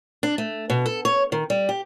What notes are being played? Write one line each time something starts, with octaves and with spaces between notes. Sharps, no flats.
D4
A3
B2
A4
C#5
D#3
G3
G4